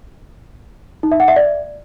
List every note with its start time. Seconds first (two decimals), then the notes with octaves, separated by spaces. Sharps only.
1.03 D#4
1.12 E5
1.20 F#5
1.28 E5
1.36 D5